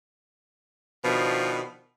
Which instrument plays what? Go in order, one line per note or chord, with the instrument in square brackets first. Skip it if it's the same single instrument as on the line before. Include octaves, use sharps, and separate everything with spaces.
[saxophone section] B2 D#3 F3 B3 D4